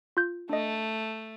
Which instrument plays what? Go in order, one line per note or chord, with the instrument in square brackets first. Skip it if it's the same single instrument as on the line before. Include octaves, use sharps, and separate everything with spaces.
[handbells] F4 G6
[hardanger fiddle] A3 [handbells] D4 D#5